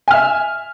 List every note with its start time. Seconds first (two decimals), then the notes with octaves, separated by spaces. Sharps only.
0.08 G#5
0.11 F6
0.14 E5